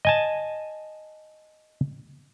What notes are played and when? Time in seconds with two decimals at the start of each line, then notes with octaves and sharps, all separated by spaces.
0.05 D#5 G#5 A5